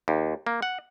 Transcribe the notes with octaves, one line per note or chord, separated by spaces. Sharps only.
D#2
A#3
F#5